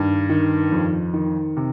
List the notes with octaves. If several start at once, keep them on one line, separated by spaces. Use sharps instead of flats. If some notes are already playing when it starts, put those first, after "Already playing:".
Already playing: G2 D#3
D#3
F2
D#3
C3